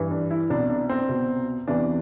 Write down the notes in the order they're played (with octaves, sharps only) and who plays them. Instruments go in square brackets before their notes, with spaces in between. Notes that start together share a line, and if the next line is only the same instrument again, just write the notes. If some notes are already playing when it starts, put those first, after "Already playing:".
Already playing: [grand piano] G2 E3
D4
E4
C2 B2 D4
D4
C4
C2 B2
E2 C3 E3 D4